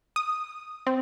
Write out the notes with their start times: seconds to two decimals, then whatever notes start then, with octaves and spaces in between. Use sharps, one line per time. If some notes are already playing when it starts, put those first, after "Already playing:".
0.16 D#6
0.87 C4